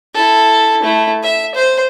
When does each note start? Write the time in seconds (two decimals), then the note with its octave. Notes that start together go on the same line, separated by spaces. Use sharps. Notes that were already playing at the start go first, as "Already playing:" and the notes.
0.14 E4 A4
0.83 A3 E4
1.23 E5
1.55 C5